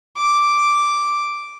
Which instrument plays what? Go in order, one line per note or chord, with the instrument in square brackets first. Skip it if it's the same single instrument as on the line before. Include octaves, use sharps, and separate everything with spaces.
[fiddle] D6